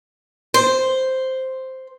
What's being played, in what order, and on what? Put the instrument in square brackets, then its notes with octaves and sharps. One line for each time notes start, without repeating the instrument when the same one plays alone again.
[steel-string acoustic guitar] C5